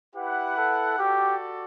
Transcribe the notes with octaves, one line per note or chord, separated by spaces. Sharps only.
E4 G4 B4 F#5
A4
F#4 G4 A4 D5